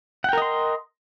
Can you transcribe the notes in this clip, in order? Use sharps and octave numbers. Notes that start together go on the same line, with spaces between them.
A#4 D#5 F#5 G5 C6